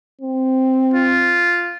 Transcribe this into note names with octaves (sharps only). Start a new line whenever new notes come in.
C4
F4